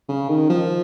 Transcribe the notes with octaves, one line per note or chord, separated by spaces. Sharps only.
C#3
D#3
F3